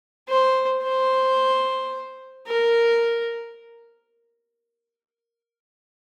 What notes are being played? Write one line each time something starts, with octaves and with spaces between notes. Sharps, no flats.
C5
C5
A#4